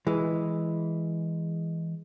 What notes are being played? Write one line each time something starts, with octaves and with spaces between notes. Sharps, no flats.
E3 G#3